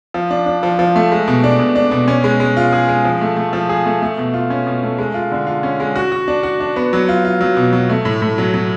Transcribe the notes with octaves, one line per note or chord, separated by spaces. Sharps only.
F3
D4
D4
F3
F3
A3
G#3
B2
D4
B2
D4
B2
C#4
G#3
G#3
F4
G#4
G#3
F3
A3
A3
F3
G#4
A3
A3
B2
F4
C#4
B2
A3
G#3
F4
D3
F4
C#4
G#3
F#4
F#4
D4
F#4
D4
B3
F#3
F4
F4
F#3
B2
F#3
A3
A2
A2
F#3
F#3